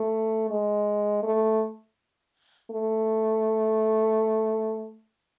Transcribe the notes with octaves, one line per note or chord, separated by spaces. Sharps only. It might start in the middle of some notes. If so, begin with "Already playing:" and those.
Already playing: A3
G#3
A3
A3